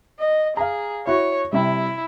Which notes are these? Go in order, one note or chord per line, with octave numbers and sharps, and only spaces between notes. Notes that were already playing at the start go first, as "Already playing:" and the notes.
D#5
G#4 F5 A#5
E4 F#4 C#5
C3 G3 E4